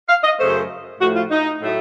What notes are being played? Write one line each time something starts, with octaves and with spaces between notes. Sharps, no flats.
F5
D#5
F#2 C#3 A3 C5
A2 F3 A3 F#4
F4
D#4
A2 F#3 A3